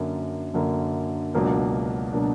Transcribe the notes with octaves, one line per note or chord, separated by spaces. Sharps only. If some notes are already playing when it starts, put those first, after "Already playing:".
Already playing: F#2 D3 A#3
F#2 D3 A#3
C#2 B2 F#3 A#3 D4
B2 F#3 A#3 D4